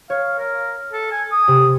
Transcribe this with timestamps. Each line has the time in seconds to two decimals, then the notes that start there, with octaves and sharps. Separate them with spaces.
0.10 C#5 F5
0.39 A#4
0.93 A4
1.12 G#5
1.32 D#6
1.48 C3